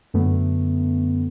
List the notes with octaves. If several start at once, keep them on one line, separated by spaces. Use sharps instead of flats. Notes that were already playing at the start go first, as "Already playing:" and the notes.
F#2 D3 A3 B3